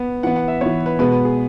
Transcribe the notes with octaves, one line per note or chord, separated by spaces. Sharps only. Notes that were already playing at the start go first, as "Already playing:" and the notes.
Already playing: B3
E3 B3 F#5
F#5
E5
E3 B3 C#5
B4
B2 G#3 B3 B4
B4
G#4